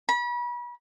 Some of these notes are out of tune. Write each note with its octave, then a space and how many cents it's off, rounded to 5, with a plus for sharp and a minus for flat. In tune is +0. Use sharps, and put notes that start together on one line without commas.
B5 -35